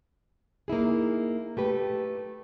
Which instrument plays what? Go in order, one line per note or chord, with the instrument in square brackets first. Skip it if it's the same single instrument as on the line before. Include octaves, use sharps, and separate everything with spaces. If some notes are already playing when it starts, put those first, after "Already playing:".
[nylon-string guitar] A#3 D#4 E4 G#4
A3 G4 B4